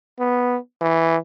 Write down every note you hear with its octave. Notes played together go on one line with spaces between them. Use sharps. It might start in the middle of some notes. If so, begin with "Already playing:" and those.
B3
E3